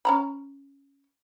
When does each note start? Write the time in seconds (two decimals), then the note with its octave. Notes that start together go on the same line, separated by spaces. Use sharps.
0.05 C#4 A#5 B5